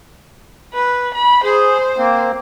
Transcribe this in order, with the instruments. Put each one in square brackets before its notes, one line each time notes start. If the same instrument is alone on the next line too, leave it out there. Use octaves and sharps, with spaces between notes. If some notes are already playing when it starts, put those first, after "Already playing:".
[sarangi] B4
B5
[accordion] G#4 [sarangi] C5
[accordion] A#3 C4